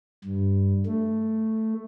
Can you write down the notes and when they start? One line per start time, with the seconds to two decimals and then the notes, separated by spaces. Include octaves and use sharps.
0.24 G2
0.86 A3